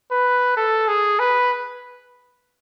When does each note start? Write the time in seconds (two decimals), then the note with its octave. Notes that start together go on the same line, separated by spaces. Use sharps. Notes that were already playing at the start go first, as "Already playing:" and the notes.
0.11 B4
0.57 A4
0.88 G#4
1.19 B4